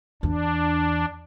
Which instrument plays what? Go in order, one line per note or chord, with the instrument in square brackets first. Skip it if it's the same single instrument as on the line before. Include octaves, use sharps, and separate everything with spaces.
[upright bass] E2 [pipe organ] D4